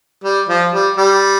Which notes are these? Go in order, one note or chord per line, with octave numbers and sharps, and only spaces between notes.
G3
F3
G3
G3